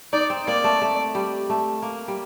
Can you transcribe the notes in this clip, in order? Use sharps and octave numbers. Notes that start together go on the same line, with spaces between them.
D#4 D5
C4
A#3 D5
A3
A3
G3
A3
A#3
G3